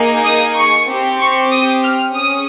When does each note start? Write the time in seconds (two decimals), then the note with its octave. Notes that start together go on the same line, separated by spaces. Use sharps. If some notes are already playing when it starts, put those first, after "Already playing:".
Already playing: A#3 D#4 G#4
0.23 D#6
0.55 C#6
0.88 C4 G4
1.19 C#6
1.51 D#6
1.84 F6
2.15 C#4 G#4 D#6